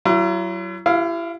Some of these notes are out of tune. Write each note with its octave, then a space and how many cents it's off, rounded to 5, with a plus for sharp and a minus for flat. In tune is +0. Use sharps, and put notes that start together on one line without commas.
F#3 +25 E4 +45
E4 +35 G4 -15 F5 +0